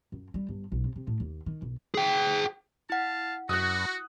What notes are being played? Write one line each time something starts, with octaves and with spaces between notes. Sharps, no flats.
F#2
G3
G1
B1
C3
C3
A2
D#2
D#3
B1
G#4 G5
E4 F5 F#5 A5
F#2 F#4 D#6 F#6